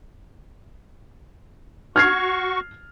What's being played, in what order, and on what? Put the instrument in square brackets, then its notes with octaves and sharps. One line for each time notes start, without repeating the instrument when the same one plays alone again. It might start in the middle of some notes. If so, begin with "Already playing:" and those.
[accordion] F#4 C#6 [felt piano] F6 G#6 C7